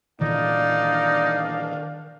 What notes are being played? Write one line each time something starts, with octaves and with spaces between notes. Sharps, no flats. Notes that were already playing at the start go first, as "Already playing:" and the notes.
A#2 D#3 E3 D4 D#4 D5 F5